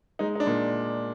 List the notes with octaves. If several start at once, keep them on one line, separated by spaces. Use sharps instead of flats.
G#3 D#4
D#4
D4
A#2